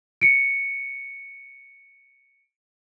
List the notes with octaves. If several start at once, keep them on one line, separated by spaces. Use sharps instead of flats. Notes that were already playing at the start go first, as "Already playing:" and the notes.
C#7 D7